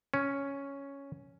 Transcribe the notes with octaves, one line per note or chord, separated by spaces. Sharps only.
C#4